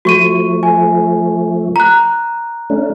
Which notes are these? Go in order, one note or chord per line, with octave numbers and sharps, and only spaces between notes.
F3 A3 F#4 C#6 D#7
G#5
A#5 F#6
A3 C#4 D4